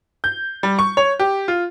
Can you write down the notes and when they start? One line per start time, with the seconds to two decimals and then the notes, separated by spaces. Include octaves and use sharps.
0.24 G6
0.63 G3
0.79 C#6
0.97 C#5
1.20 G4
1.48 F4